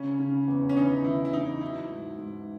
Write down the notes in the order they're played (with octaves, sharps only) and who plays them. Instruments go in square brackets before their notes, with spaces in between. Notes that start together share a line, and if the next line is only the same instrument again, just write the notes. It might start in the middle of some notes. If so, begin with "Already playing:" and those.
Already playing: [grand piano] C#3 [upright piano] C#4
[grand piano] C#3
E2
[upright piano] C#4
[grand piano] E3 [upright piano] D#4
[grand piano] E3 [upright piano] E4
[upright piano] E4
[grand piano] E3 [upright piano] D#4
[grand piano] F#3 [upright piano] E4
[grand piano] G#2
G#2